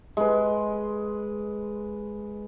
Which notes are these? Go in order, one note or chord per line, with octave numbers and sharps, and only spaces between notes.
G#3 B4